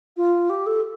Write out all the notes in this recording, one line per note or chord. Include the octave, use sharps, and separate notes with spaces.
F4
G4
A4